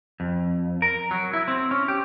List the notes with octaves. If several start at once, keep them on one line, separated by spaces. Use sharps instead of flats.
F2
A#4
F#3
E4
C4
C#4
G4